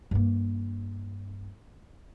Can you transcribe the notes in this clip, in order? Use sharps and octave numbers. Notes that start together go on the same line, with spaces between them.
G2 A#3